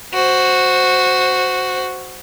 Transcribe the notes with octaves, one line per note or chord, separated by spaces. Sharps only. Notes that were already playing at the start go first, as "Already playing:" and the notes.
F#4 C5